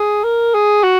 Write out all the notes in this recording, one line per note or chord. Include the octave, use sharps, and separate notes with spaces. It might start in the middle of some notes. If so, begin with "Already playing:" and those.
Already playing: G#4
A#4
G#4
F#4